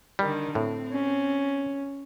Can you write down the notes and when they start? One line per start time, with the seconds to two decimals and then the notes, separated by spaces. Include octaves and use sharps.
0.19 D3 D#3 G3
0.55 A2 C4
0.91 C#4